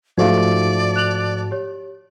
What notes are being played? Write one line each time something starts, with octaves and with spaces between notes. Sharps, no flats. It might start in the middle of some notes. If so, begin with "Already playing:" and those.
G#2 F3 A3 D#4 F#4 G4 D5 F5
F#6 F7 F#7
G4 C#5